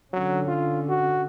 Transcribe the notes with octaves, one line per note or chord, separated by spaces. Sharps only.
D3 F#3 C#4
F4
F#4